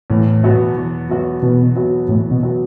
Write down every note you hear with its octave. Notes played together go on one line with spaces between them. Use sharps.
E2 A2
B2 F#3 B3 F#4
E2
B2 F#3 B3 F#4
E2 B2
B2 F#3 B3 F#4
E2 A2
B2
B2 F#3 B3 F#4